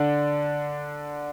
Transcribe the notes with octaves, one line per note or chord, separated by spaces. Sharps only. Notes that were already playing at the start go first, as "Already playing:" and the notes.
Already playing: D3 D4